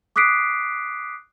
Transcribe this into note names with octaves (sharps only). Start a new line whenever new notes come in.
D6 D#6 F#6 B6 C7 D7